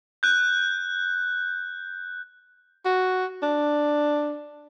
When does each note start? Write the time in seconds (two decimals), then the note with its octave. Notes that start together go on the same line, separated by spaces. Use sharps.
0.23 F#6 G6
2.85 F#4
3.43 D4